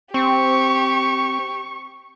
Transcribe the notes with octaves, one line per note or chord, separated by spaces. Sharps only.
C4 G4 C#6